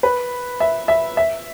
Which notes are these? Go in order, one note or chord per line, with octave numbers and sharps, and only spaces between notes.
B4
E5
E5
E5